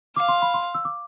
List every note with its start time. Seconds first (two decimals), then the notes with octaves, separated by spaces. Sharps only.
0.16 F5 D6
0.28 C6
0.42 B5
0.54 C6
0.74 E6
0.85 D6